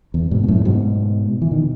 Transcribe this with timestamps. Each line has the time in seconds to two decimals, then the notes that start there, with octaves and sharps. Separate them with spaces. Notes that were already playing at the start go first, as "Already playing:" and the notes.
0.14 E2
0.31 G#2 B2
0.44 B2
0.48 F#2 A2
0.65 G#2 B2
1.42 E3
1.51 B2 D#3